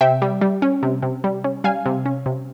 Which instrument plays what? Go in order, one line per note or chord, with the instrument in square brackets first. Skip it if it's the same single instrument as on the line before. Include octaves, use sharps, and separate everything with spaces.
[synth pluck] C3 E5 G5
G3
G3
C#4
C3
C3
G3
C#4
G3 F5 G#5
C3
C#4
C3